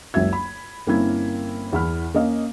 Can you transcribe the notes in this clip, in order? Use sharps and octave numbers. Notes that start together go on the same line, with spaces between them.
F#1 C#2 F#4 E5 G#6
B5
G1 A#3 C4 C#4 E4 G#6
E2 E4 B5 F6
A#3 C#4 D#5 F5